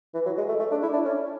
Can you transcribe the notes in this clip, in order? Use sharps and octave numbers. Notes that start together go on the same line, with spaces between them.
E3
F#3
G#3
A3
A3
D4
E4
D4
C#4